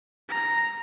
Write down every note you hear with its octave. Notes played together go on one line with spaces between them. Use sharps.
A#5